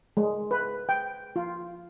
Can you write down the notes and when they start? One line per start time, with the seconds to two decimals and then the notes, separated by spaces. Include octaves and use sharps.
0.17 G#3
0.51 B4
0.89 G5
1.36 F4